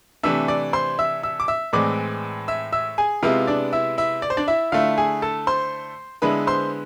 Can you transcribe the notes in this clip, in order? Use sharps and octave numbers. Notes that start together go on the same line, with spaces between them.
C3 E3 A3 D4 E5 E6
D5 D6
C5 C6
E5 E6
E5 E6
D6
E5 E6
A2 E3 G#3 C4 D5 D6
E5 E6
E5 E6
G#4 G#5
C3 G#3 B3 E4 F4 F5
D4 D5
E4 E5
E4 E5
D5
C5
D4 D5
E4 E5
D3 A3 E4 F4 F5
G#4 G#5
A4 A5
C5 C6
D3 G#3 B3 E4 B4 B5
C5 C6